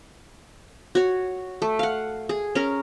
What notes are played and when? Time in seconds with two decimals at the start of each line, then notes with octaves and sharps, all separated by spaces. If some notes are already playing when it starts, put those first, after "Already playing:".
0.95 F#4 C#5
1.62 A3
1.79 F5 F#5
2.29 G#4
2.55 C#4 A#4